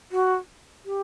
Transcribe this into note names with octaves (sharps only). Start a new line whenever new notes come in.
F#4
G4